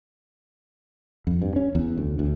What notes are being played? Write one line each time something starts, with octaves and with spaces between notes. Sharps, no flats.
F2
G2
C#4
E2
D2
D2